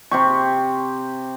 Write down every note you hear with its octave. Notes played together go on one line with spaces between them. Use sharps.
C3 G4 C#6